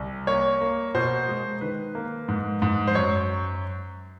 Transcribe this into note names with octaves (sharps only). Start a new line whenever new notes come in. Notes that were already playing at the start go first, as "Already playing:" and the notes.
Already playing: C2
A#3 C#5
A#3
B2 C5
G#3
D#3 B4
A#3
G#2
G#2
C5
F#2 C#5